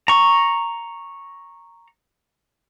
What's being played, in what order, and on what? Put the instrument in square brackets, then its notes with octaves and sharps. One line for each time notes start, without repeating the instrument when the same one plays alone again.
[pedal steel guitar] A#5 C#6